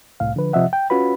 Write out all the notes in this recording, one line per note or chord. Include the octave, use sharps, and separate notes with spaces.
C2 A2 F5
D3 F3 B4
C3 F3 D#5 E5 F#5
G5
C#4 F4 F#4 B4 B5